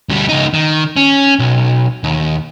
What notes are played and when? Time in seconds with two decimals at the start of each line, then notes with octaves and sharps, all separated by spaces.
0.09 D2 G3
0.29 C#2 D#4
0.54 D#3
0.97 C#4
1.39 B1
2.04 D#2